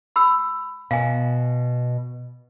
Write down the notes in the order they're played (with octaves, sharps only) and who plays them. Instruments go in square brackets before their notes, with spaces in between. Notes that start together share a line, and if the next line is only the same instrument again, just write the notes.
[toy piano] B5 E6
[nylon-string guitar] B2 [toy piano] F5 G#5